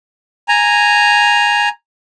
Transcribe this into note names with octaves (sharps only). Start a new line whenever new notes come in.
G#5 A#5